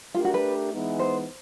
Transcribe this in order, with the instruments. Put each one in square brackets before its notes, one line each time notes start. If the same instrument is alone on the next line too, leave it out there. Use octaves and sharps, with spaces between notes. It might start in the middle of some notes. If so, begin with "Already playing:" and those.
[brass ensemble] A3 D4 G4 A#4 [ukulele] F4
[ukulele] F#4
B4
[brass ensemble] E3 G#3 B3 D#4
[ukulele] C5